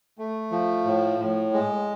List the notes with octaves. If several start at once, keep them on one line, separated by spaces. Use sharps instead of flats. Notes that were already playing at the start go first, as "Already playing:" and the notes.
A3
F3
A2
A2
G#3